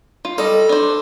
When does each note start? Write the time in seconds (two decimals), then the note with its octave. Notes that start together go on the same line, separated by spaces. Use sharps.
0.25 F4
0.38 G3 A4 D#5
0.69 D4 C5